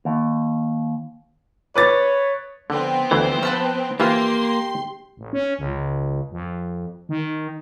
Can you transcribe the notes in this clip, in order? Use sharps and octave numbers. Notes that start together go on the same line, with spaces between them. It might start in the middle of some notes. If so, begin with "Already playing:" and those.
D#2
B4 C#5 D6 A6
D3 F3 B3 C4
D2 E3 C5
B4 F5 A5 E6
E3 A#3 F4 G4 C6
A1
C#4
C#2
F2
D#3